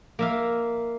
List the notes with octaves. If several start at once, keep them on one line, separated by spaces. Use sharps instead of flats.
A#3 E5 F5